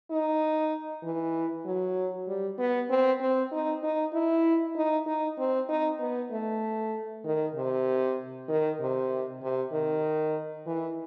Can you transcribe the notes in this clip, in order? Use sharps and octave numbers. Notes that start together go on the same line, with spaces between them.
D#4
E3
F#3
G3
B3
C4
C4
D#4
D#4
E4
D#4
D#4
C4
D#4
B3
A3
D#3
C3
D#3
C3
C3
D#3
E3